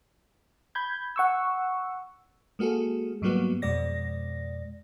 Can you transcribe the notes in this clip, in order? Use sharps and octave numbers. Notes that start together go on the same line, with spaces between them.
B5 G6 G#6
F#5 C#6 E6
G#3 A#3 F#4 G#4 A4
G#2 F#3 G3 A#3 B3 F#4
F2 B2 G#3 D5 A#6